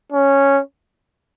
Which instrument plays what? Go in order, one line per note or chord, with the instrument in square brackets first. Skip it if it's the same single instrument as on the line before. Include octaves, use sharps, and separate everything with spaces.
[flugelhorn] C#4